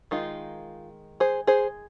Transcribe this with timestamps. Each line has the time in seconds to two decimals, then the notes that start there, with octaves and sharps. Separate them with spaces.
0.11 D#3 G#3 D#4 F4
1.20 G#4 C5
1.47 G#4 C5